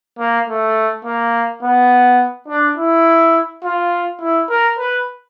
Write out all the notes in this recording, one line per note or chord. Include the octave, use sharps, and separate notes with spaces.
A#3
A3
A#3
B3
D4
E4
F4
E4
A#4
B4